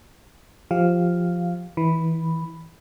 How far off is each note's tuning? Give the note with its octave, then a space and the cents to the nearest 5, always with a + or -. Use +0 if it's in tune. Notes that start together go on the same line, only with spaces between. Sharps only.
F3 +0 G4 +5 F5 +0
E3 -20 B5 +0